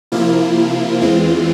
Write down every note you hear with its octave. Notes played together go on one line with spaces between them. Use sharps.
C3 F3 A#3 E4 F4
E2 E3 G#3 C4